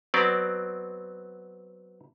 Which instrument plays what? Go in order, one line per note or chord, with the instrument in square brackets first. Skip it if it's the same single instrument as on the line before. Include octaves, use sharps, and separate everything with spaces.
[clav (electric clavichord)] F#3 B3 C4 D5